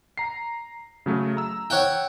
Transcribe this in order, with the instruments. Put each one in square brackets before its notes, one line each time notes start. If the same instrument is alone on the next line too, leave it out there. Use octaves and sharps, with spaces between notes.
[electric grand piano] A#5 C7
C#3 F#3 A3
A#5 E6
[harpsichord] C#5 F#5 G5